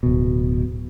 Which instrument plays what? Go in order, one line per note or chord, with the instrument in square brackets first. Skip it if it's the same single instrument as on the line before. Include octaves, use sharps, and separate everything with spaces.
[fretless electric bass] D1 B2